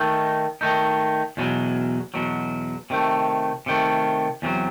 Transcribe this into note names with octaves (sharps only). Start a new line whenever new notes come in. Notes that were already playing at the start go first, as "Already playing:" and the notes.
Already playing: D#3 A3 D#4
D#3 A3 D#4
E2 B2 F#3
E2 B2 F#3
C3 D#3 A3
C3 D#3 A3
E2 C3 D#3 F#3